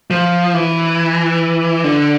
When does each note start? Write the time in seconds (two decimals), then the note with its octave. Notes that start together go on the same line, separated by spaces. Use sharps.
0.10 F3
0.54 E3
1.84 D3